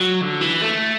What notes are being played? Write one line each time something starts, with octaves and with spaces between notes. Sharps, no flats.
F#3
D3
E3
A3